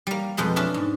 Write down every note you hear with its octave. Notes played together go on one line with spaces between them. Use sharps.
G3 A#3
F2 B2 G#3 B5
C#4 D4 E5
G#2